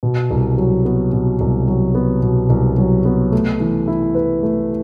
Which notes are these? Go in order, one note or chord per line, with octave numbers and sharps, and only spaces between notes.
B2
C2
F#3
B3
B2
C2
F#3
B3
B2
C2
F#3
B3
A3
E3
E4
B4
A3